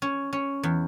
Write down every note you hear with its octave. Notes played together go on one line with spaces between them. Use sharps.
C#4
C#4
E2